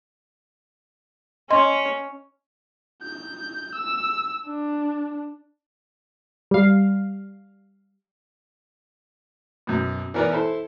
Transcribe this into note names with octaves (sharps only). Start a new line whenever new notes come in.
C#4 C#5 D#5 C6
G6
E6
D4
G3 F5
F#2 B2
E3 B3 A#4 B4 D5
E4 A4 C5